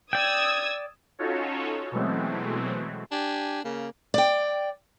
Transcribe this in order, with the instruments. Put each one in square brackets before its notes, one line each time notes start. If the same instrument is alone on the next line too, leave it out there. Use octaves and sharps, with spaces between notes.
[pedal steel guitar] D5 G5 [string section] D#6 E6 G#6
[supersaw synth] C#4 D#4 F4 F#4 A4 C#5
B2 E3 F#3 G#3 A3 C4
[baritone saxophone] D4 [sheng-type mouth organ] G4 G#5
[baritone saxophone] C#3 [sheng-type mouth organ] A#3
[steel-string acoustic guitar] D5 G5